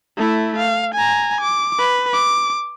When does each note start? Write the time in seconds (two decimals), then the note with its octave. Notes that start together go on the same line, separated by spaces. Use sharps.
0.17 A3 E4
0.57 F5
0.94 G#5 A#5
1.41 D6
1.79 B4
2.13 D6